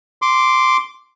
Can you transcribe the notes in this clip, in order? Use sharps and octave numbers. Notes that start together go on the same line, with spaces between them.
C6 D6